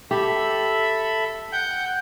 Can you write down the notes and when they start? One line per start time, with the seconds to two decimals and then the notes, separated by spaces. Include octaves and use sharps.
0.11 G4 A4 E5 B5
1.52 F#5 G5 G6